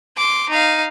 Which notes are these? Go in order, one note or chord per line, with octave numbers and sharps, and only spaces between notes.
C6 D6
D#4 F5